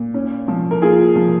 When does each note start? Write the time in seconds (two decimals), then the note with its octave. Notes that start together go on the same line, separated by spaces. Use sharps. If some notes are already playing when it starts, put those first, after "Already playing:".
Already playing: A#2
0.14 C#4
0.48 F3
0.71 A#4
0.82 A#3 F4 G#4
1.16 F3